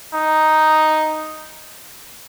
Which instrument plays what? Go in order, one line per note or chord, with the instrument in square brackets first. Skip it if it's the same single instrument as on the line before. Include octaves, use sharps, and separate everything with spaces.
[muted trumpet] D#4